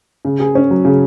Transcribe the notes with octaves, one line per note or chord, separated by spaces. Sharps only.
C#3
G#4
C#4
F#3
C#3